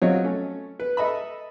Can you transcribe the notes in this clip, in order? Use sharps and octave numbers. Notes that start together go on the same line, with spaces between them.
F#3 C4 F4 C#5 D#5
A3 C#4
B4
A4 D#5 E5 B5